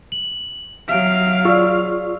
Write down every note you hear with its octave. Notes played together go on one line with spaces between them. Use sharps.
F#7
F#3 E5 F5 D7
F4 G#4 D5 C#6 E6